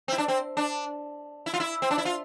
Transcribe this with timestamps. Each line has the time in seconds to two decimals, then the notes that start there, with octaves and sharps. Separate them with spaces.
0.08 C4
0.12 E4
0.18 D4
0.28 C4
0.57 D4
1.46 E4
1.54 F4
1.60 E4
1.82 C4
1.91 D4
1.98 E4
2.05 F4